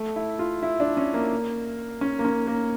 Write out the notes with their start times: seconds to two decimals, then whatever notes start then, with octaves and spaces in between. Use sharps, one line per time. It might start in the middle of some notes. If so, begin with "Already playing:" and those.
Already playing: A3
0.16 E4
0.39 F4
0.63 E4
0.80 D4
0.97 C#4
1.14 A#3
2.01 C#4
2.19 A#3
2.25 C#4
2.47 A#3